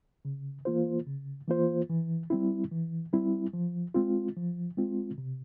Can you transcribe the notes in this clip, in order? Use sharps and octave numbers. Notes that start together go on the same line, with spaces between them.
C#3
E3 A#3 F4 C5
C#3
E3 A#3 F4 C5
E3
G3 C4 E4
E3
G3 C4 E4
F3
G#3 C4 F4
F3
G#3 C4 F4
C3